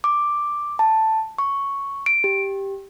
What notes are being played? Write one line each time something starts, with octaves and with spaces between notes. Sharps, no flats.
D6
A5
C#6
D7
G4